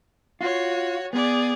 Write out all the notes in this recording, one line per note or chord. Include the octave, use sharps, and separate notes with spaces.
F4 F#4 C#5
B3 G#4 D5